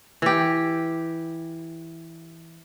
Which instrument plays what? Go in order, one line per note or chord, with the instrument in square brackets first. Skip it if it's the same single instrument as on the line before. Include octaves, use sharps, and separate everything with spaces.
[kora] E3 G4